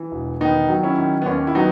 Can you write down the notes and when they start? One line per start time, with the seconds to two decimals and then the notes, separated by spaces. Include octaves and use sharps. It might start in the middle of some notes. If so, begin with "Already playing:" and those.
Already playing: E3
0.12 E1
0.41 D#3 B3 D#4
0.68 F#3
0.83 C#4 E4
0.98 D#3
1.22 B3
1.26 D#2 C#4
1.47 E4
1.55 F#3 B3 D#4